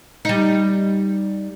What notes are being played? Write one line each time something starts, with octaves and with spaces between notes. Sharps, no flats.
G3 D#4